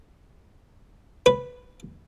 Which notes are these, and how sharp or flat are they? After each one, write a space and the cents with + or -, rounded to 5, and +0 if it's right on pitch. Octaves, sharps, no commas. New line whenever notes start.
B4 +0